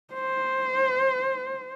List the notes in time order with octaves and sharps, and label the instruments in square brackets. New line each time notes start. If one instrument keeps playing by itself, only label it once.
[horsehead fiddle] C5